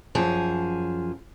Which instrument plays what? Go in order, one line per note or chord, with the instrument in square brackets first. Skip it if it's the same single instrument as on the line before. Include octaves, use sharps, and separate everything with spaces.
[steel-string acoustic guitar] F#2 F3 G#4